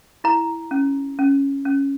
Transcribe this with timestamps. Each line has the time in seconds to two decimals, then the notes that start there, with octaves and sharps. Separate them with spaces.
0.24 E4 A#5
0.71 C#4
1.19 C#4
1.65 C#4